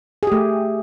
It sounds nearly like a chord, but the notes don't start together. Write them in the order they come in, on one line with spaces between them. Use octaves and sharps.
G#4 G4 A3